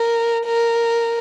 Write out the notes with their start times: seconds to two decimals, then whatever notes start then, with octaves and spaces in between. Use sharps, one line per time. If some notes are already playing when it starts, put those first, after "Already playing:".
Already playing: A#4
0.46 A#4